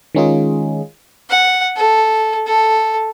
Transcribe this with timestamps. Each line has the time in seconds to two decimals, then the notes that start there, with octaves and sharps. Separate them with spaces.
0.15 D#3 G#3 C#4 D#4 F4 G#4
1.30 F#5
1.76 A4
2.47 A4